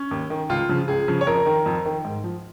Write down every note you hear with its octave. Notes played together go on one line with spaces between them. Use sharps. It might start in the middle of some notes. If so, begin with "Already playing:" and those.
Already playing: C#4
D#2
D#3
C#2 F4
C#3 F3
C#2 G#4
C#3 F3
C#5
F2 A#4
D#3
F2
D#3
G#2
F3